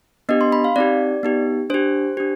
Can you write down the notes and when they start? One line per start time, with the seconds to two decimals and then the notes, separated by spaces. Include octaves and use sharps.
0.29 B3 D4 G4 D#5
0.41 C6
0.52 B5
0.64 F5
0.76 C4 D#4 G4 D5
1.23 B3 D#4 G4
1.70 D4 G4 C5
2.17 D4 G4